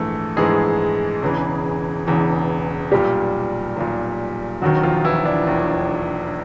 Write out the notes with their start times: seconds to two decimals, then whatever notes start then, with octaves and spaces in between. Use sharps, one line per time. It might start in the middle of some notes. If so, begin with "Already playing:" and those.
Already playing: A#1 G#2 E3 A3 A4
0.37 A#1 G#2 E3 G#3 G#4
1.21 E1 E2 C#3 E3
2.07 E1 E2 C#3 E3
2.91 B1 A#2 G3 G4
3.77 B1 A#2
4.62 E1 D#2 D#3 F#3 F#4
4.83 F3 F4
5.04 E3 E4
5.25 D4
5.47 E1 D#2 D#3